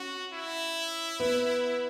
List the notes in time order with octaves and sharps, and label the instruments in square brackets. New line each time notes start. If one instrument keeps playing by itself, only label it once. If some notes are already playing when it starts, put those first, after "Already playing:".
Already playing: [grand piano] C#4 [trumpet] F#4
[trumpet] E4
[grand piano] B3